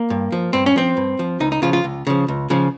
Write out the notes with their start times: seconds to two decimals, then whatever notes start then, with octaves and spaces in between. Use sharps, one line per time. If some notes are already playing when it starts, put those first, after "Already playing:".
Already playing: A#3
0.10 G2
0.32 F3
0.53 G2 C4
0.66 C#4
0.76 F3 C4
0.97 G2
1.19 F3
1.40 C#2 D#4
1.52 D#4
1.62 C#3 F3 F4
1.73 F4
1.84 C#2
2.07 C#3 F3
2.28 C#2
2.50 C#3 F3